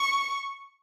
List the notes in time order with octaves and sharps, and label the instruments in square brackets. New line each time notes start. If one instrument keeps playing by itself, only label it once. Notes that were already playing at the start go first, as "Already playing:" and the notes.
Already playing: [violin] C#6